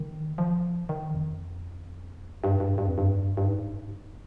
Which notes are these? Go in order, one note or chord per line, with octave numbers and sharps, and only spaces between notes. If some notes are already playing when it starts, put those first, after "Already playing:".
Already playing: D#3
F3
D#3
F2
G2
G2
G2
F2
G2
G2
G#2